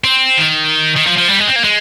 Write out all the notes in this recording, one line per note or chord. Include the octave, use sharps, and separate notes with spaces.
C4
D#3
D#3
F3
F3
G3
G#3
C4
A#3
G#3